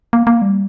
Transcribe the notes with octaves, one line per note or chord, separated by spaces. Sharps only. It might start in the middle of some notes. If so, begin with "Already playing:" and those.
A#3
A#3
G3